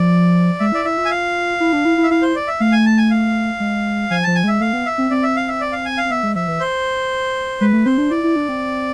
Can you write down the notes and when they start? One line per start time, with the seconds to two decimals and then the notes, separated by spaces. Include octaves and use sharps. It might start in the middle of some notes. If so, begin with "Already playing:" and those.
Already playing: F3 D5
0.60 G#3 E5
0.72 E4 D5
0.85 E4 E5
0.97 F4
1.05 G#5
1.11 F5
1.60 E4
1.73 D4
1.85 E4
1.98 E4
2.03 E5
2.11 E4 F5
2.22 C5
2.36 D5
2.48 E5
2.60 A3 F5
2.72 G#5
2.85 A5
2.98 G#5
3.11 F5
3.60 G#3
4.11 F3 G#5
4.23 F3 A5
4.35 G#5
4.44 G#3 E5
4.60 A3 F5
4.73 B3
4.86 E5
4.98 C4
5.11 C4 D5
5.23 E5
5.36 F5
5.48 E5
5.61 D5
5.72 F5
5.85 G#5
5.98 F5
6.05 C4
6.11 B3 E5
6.23 G#3
6.35 F3 E5
6.48 E3
6.60 C5
7.60 G#3 B4
7.73 A3
7.85 C4 C5
7.98 D4
8.10 E4 D5
8.24 E4
8.36 D4
8.49 C4